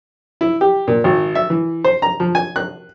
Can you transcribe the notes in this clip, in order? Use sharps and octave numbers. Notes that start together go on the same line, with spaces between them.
E4
G4
A#2
G#1
E5
E3
C5
A#5
F3
G#5
F#6